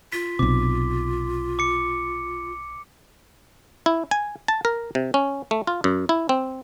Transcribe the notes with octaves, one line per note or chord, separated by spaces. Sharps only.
F4 B6
B1 C3 D6
D6 C#7
E4
G#5
A5
A#4
C3
C#4
A3
F4
F#2
E4
C4